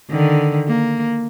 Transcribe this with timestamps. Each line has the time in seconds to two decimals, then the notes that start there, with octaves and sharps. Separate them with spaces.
0.10 D3 D#3
0.68 A#3